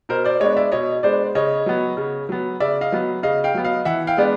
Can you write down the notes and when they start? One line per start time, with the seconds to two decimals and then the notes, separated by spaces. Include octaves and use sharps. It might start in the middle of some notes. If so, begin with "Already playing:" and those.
0.09 B2 A#4 C5
0.24 C5 D5
0.40 G#3 B3 D4 C#5 D#5
0.57 D5 E5
0.72 B2 C#5 D#5
1.03 G#3 B3 D4 C5 D5
1.35 C#3 C#5 D#5
1.66 F#3 B3
1.97 C#3
2.29 F#3 B3
2.60 C#3 D5 E5
2.81 D#5 F5
2.92 F#3 B3
3.23 C#3 D#5 F5
3.44 F5 G5
3.54 F#3 B3
3.65 D#5 F5
3.85 E3 E5 F#5
4.07 F5 G5
4.17 G#3 B3 D4